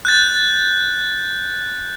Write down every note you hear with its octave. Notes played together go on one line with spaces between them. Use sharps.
F#6 G6 A6